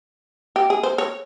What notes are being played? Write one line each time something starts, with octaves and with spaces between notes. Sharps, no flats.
G4
G#4
C5
C#5